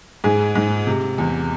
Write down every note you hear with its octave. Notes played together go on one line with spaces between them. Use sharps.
G#2 G#4
G#2
C3
E2